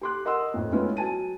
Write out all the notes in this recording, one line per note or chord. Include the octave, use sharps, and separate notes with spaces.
G4 A4 C6 D6 F#6
A#4 D#5 F#5 C6 E6
A1 F2
G#3 A3 B3 C#4 E4 F4
F#3 G#5 A5 D#7